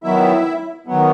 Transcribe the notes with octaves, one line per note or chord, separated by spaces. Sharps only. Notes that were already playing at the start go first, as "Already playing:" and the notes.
D#3 F#3 B3 E4 E5
D#3 F#3 B3